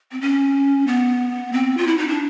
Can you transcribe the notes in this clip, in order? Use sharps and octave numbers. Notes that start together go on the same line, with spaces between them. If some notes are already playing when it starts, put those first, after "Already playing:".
C4
C#4
B3
C4
F4
E4
D#4
D4